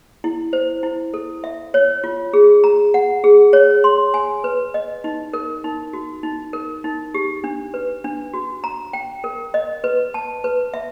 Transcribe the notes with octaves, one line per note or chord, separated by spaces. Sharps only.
E4
C5
E4
A4
E5
C#5
F4
G#4
A#5
F#5
G#4
C#5
C6
G#5
B4
D#5
D#4
A#4
D#4
F#4
D#4
A#4
D#4
G4
D4
B4
D4
F#4
A#5
G5
A#4
D#5
B4
A5
B4
E5